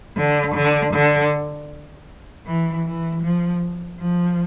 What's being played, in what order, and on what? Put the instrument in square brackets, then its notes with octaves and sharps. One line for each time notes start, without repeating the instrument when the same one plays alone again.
[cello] D3
D3
D3
E3
E3
F3
F3